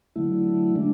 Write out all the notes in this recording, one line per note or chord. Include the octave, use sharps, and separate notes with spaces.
D3 F#3 A3 E4
D3 G#3 D4